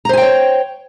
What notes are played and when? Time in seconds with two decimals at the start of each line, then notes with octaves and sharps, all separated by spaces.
0.05 A#5
0.09 C5
0.13 G#5
0.17 G5
0.22 C#5